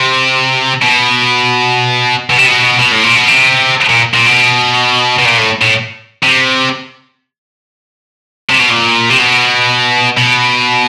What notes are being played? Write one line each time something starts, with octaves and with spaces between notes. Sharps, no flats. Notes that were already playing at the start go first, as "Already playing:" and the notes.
Already playing: C3
B2
B2
C3
B2
B2
A2
A#2
B2
C3
A#2
A#2
B2
B2
A#2
A2
A2
C3
C3
B2
A#2
C3
B2
B2